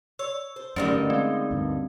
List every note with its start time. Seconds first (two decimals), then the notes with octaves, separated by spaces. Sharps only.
0.19 C#5 E6
0.56 C5
0.76 F#2 D3 D#3 G3 A3 C#4 D#4
0.93 D2 G2
1.10 G#3 C4
1.51 D2 G2